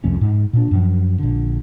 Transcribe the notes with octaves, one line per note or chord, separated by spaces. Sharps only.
C2 F2 A3 C#4
G#2
A#2 D4
F#2 F3
A#1 D3